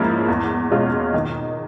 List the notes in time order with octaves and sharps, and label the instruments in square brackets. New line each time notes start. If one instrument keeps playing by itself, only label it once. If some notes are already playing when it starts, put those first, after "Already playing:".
Already playing: [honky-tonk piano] G#2 F3 A#3 C#4 E4
E2
B2 G#3 C#4 F4
D#3